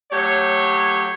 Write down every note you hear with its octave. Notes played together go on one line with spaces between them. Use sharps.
F#3 A3 G4 C#5